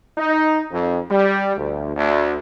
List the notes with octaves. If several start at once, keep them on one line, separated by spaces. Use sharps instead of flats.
D#4
F2
G3
D2
D2